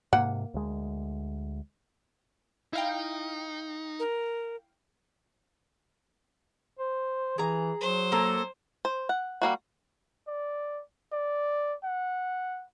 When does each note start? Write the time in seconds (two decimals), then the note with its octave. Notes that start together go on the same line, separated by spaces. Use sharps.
0.13 G#2 C3 A#3 F#5
0.54 D2 G#3
2.73 D#4 E4 F5 G5
3.99 A#4
6.79 C5
7.38 E3 G#4 A#5
7.81 F#3 C5
8.12 A#3 A4 A#5
8.85 C5
9.09 F#5
9.42 G3 A#3 F#4
10.28 D5
11.12 D5
11.84 F#5